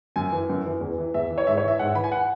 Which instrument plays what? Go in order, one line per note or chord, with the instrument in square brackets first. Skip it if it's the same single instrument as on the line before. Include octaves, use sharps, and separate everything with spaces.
[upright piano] F#2 G#5
E3
F#2
E3
E2
E3
E2 E5
E3
C#5
G#2 E5
C#5
E3 E5
G#2 F#5
E5
E3 B5
G#5
F#5